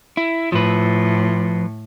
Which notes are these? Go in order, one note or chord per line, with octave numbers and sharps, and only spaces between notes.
E4
A2 F3 B4